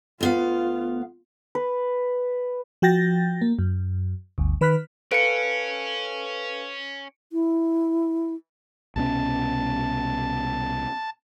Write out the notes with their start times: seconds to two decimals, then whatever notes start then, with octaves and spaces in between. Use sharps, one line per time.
0.21 D2 B3 F4 F5
1.55 B4
2.82 F3 F#4 G5 G6 A6 A#6
3.42 A#3
3.59 F#2
4.38 G1 D2
4.61 D#3 B4 B5 F6 F#6 B6
5.12 C#4 A4 B4 F5 C#7 D7
7.33 E4
8.96 C2 B2 C#4 A5